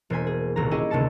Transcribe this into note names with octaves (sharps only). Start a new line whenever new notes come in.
E1 A#3 C5 G#5 B6
G#4
D#1 C2 F#4 G#4 A#5
C#4 E4 G4 G#4 D#5 G#5
D#1 D2 C3 A#3 A5 C#7